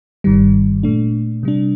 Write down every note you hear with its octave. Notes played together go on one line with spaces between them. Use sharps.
G1 G2 D#3 G3
A#2 A3 D4
C3 G3 D4